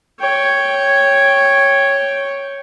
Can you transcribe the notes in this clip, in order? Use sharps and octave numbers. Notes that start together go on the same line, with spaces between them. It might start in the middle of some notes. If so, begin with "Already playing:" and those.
C#5 G5